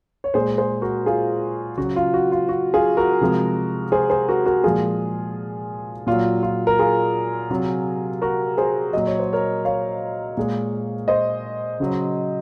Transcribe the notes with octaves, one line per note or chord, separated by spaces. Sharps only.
C#5
A#2 G#3 G#4 C5
G#4 C5
F#4 A#4
F4 G#4
C#3 F#3 F#4
F4
F#4
F4
F#4
F4 G#4
F#4 A#4
C3 F3 G#3
G#4 C5
G#4 C5
F#4 A#4
F#4 A#4
A#2 F3 G#3 F4 G#4
A#2 F#3 F4
F4
A#4
F4 G#4
C3 F#3
F#4 A#4
G#4 C5
A#2 F#3 D#5
C#5
C5
A#4 C#5
C#5 F5
A#2 G#3
C5 D#5
C#3 F#3